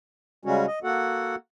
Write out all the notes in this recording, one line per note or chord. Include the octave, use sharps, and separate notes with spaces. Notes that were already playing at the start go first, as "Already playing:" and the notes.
C#3 G3 G#3 C#4 F#4
D#5
A#3 F#4 A4 F#5